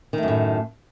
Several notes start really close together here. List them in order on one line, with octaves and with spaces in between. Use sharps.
D#3 A3 F#2 A2